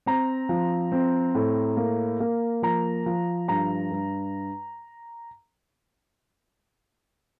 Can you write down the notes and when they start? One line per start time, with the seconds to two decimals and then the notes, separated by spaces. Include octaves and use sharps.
0.06 C4 A#5
0.49 F3
0.92 C4
1.35 A2
1.77 A#3
2.20 A#3
2.62 F3 A#5
3.06 F3
3.48 G2 A#5
3.91 G2